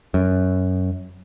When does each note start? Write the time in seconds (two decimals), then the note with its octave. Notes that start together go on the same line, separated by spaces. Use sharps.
0.14 F#2